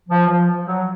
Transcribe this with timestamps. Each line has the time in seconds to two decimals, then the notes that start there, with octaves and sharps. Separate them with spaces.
0.09 F3
0.28 F3
0.65 F#3